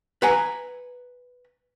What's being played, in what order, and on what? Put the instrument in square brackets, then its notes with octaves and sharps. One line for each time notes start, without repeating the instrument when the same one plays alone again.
[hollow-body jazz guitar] B4 F#5 G#5 A#5